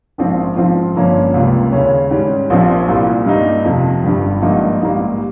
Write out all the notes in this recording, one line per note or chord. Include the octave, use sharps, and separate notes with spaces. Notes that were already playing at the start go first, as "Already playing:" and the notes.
A#1 G#2 F3 C4
G#2 F3 C4 F4
G1 G2 F3 A#3 C#4
C#2 C3 G3 A#3 F4
D#2 C#3 G3 C#4
G#2 G3 C#4
A#1 A#2 F3 C4
C2 A#2 G3 A#3
G2 G3 A#3 D#4
F2 C3 F3
G1 G2 G3
G#1 G2 F3 A#3 D#4
A#1 G#2 G3 A#3